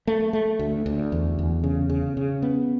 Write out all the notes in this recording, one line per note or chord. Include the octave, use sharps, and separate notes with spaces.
A3
A3
D2
D2
E2
E2
C#3
C#3
C#3
B3